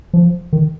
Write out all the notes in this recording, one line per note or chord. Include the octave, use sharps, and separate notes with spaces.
F3
D#3